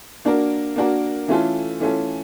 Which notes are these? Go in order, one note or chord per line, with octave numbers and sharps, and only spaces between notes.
A#3 D4 F#4 A#4
A#3 D4 F#4 A#4
E3 A3 C#4 F4 A4
E3 A3 C#4 F4 A4